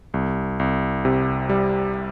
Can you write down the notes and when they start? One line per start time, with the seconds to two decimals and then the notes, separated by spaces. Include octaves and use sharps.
0.14 C2
0.60 C2
1.05 C3
1.49 G3